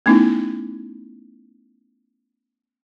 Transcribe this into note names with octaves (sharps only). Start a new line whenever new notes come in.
A3 B3 C#4 D#4 E4